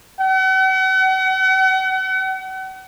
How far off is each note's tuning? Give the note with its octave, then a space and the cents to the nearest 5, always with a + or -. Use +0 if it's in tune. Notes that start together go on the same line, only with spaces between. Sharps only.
F#5 +40